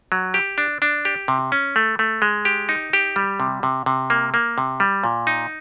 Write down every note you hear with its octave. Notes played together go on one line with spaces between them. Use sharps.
F#3
G4
D4
D4
G4
C3
C#4
A3
A3
G#3
G4
D#4
G4
G3
C3
C3
C3
A#3
A#3
C3
G3
A#2
D#4